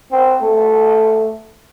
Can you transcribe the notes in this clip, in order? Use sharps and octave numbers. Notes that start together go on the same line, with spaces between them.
C4
A3